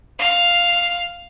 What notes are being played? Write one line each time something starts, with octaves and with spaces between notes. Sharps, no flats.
F5